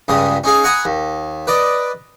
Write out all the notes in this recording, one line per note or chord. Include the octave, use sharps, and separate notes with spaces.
C#2 G2 C#3 D#6
C#4 D#4 G#4 F5
F#5 G#5 A#5 B5 C#6 D#6
D#2
B4 D5 D#5